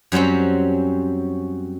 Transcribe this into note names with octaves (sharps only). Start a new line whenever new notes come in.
F#2 F#3 G3 C4 C#4